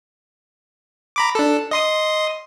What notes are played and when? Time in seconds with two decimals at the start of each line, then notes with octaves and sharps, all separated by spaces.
1.16 A#5 B5 D6
1.35 D4 A4
1.71 D#5 C6 D#6